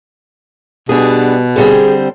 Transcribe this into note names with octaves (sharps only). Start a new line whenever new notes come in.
B2 G3 B3 D4 G4 G#4
D3 G3 C4 G#4